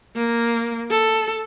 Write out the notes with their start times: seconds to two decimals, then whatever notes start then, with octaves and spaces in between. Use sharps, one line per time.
0.15 A#3
0.90 A4